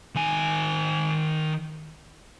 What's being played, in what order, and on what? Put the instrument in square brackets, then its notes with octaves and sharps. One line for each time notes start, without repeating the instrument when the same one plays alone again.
[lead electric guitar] D#3 G#5